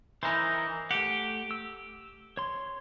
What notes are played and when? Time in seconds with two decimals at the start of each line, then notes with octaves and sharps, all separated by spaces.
0.23 E3 D#4 E4 A#4 C5
0.91 A3 G4 F#5
1.51 E6
2.37 C#5 C6